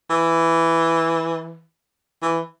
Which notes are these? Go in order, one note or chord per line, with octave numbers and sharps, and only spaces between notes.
E3
E3